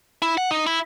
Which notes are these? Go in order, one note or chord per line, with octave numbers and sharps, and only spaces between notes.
E4
F#5
D#4
E4